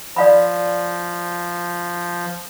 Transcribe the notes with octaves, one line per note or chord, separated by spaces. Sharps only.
F3 D5 F5 B5